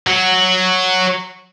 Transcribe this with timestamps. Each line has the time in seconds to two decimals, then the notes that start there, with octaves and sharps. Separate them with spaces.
0.07 F#3 F#4